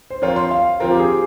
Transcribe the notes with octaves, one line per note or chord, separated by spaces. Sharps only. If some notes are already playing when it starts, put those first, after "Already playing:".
C5
F3 C4 F4 A#4 C#5
C6
F5
F3 C4 F4 A#4 C5
G4
G#4